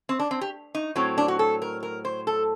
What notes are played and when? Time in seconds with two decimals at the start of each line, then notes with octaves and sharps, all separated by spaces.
0.09 C4
0.20 D4
0.31 C4
0.41 G4
0.75 D#4
0.96 A2 F#3 C4
1.18 D4
1.28 F#4
1.39 A4
1.62 A#4
1.83 A#4
2.05 C5
2.27 A4